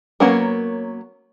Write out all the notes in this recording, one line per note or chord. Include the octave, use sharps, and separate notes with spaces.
F#3 A#3 B3 C#4 A#4